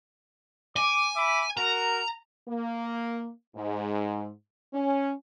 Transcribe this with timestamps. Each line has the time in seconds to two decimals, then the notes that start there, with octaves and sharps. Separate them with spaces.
0.76 G#5 D6
1.16 E5 B5 D6
1.57 F#4 A#4 A#5
2.47 A#3
3.54 G#2
4.73 C#4